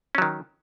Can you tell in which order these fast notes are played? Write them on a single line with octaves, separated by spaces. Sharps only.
C#4 F#3 D#3